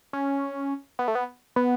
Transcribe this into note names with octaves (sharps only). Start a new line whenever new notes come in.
C#4
B3
A3
B3
B3